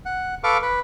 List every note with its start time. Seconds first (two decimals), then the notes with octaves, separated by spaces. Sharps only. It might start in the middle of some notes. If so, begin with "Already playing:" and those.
0.05 F#5
0.44 A4 B4 F5 C#6 D6
0.63 B4